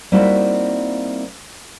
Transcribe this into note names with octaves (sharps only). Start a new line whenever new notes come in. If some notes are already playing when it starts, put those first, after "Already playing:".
G3 A#3 C4 D#4 E4 F#4